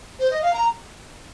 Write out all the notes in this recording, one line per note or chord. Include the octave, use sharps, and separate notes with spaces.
C5
D#5
F5
A#5